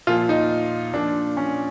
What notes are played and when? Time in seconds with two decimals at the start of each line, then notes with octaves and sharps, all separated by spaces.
0.07 A#2 F3 F4
0.29 D#4
0.93 A#2 F3 D4
1.37 C#4